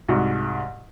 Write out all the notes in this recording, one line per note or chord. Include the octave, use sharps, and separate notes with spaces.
C2 G#2 F#4